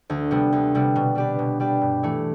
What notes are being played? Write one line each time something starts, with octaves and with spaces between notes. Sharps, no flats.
D2
C3 G3 B3
D2
C3 G3 B3
B2
G3 D4 G4 B4
B2
G3 D4 G4 B4
G2
E3 A3 E4